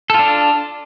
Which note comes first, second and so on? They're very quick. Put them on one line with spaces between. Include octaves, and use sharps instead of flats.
A4 F4 D4